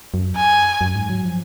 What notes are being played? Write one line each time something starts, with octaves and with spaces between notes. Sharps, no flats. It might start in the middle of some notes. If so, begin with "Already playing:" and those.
F#2
G#5
F#2
G#2
F#3
F3